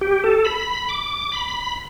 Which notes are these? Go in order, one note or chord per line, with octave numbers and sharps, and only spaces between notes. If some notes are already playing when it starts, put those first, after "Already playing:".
G4
A4
B5
D6
B5